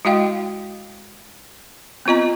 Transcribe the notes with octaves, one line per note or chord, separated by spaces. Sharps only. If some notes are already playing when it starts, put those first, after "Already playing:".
G#3 E4 F#4 D#5 F5 G5
B3 C4 F4 D#5 A#5